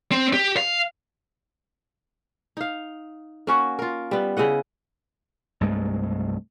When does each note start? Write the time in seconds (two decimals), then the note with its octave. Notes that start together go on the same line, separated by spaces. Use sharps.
0.11 C4
0.34 G4
0.57 F5
2.57 D#4 F5
3.47 A#3 C#4 F#4
3.79 F4 A#4
4.11 G3 B3
4.37 C#3 E4 D#5 F#5
5.61 C2 G2 G#3 A3